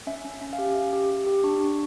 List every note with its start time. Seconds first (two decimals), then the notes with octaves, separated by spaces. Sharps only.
0.07 C#4 E5
0.25 C#4
0.41 C#4
0.53 F5
0.59 G4
0.75 G4 E5
0.93 G4
1.10 G4
1.27 G4
1.44 D4 C#6
1.61 D4